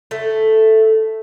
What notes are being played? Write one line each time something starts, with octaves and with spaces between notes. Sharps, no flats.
A3